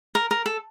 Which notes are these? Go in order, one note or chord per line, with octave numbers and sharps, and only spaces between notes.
A#4
A#4
A4